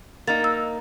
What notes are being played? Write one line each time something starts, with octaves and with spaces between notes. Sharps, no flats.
A#3 D#4 A6
E6